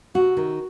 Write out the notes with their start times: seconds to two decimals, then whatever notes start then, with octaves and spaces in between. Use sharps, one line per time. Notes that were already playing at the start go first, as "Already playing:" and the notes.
0.14 C3 F#4
0.37 D#3